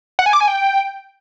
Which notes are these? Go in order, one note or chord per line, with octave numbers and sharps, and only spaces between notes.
F#5
G#5
D6
G#5
G5